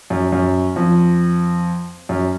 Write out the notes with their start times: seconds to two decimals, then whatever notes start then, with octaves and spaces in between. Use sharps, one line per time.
0.10 F#2
0.32 F#2
0.76 F2
2.09 F#2